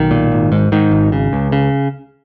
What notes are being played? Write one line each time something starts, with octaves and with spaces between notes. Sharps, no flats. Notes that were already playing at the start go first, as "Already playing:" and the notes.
Already playing: B1 D#3
A#2
G#1
G#2
G#2 D#3
G#1
C#3
C#2
C#3